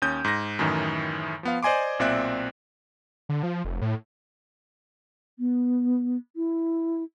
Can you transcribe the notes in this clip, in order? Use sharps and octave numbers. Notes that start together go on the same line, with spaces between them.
D#2 C#4 D#6 G6
G#2 A#6
F#2 A2 D#3 E3
F3 B3 F5
C5 D5 D#5 G#5 C6 D6
B1 A#2 C4 D5 E5 F#6
D3
F3
F1
A2
B3
E4